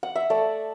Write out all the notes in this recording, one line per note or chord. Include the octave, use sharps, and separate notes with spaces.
F#5
E5
A3 D5